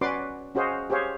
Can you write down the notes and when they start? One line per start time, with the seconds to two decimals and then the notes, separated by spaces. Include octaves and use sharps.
0.01 C#4 F#4 B4 D5 C6 D6
0.55 C#4 F#4 G#4 C5 D#5 F5
0.90 G4 G#4 C5 C#5 F5